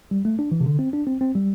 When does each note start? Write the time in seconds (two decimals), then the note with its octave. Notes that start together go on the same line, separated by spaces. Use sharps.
0.11 G3
0.25 A3
0.39 D4
0.52 E3
0.60 C3
0.66 D3
0.79 C4
0.93 D4
1.07 C4
1.21 C4
1.35 G3